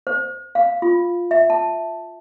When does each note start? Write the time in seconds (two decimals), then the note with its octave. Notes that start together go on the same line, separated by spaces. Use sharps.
0.07 C5
0.55 F5
0.82 F4
1.31 E5
1.50 A5